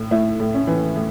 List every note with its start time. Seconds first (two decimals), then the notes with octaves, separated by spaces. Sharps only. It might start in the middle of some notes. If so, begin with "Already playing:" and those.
Already playing: A2
0.11 A3 E4
0.40 A2
0.54 C#4
0.67 E3
0.96 A2